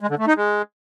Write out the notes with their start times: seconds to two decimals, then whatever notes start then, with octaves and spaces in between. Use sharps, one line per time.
0.01 G#3
0.10 D3
0.19 A3
0.28 D#4
0.37 G#3